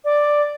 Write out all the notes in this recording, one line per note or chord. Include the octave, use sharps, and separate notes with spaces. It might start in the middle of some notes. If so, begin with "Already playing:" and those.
D5